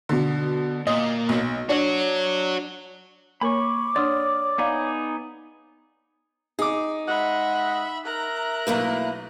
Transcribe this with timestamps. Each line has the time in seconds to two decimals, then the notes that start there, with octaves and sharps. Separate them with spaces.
0.09 B2 D3
0.87 A#2 D#5
1.29 B1
1.69 D4 F#4 C#5
3.41 A#3 A#4 C#5 B5 C#6 D6
3.96 D4 D5 F#5 C6 D#6 F6
4.58 B3 D#4 G#4 D5 F5
6.59 D#4 G#4 D6
7.07 G#3 D#5 E5 F#5 B5
8.05 A#4 E5 A#5 F#6
8.67 B1 A3 A#3 E4 B4